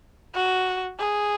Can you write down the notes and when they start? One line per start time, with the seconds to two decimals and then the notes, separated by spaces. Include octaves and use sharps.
0.35 F#4
0.99 G#4